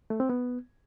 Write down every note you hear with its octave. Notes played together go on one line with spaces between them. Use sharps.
A3
C4
B3